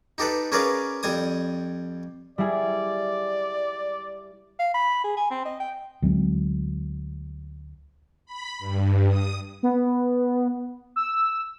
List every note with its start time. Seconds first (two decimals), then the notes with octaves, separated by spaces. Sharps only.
0.18 D#4 G4 A4 B4
0.52 C#4 G#4 A#4 B4 D5 F5
1.03 F2 G3 G#5 D#6
2.38 G3 E4 G#4 D5
4.59 F5
4.74 B5
5.04 G#4
5.17 G#5
5.30 C4
5.45 D#5
5.60 G5
6.02 D2 F#3 G#3 C4
8.26 B5
8.59 G2
9.08 D#6
9.63 B3
10.96 E6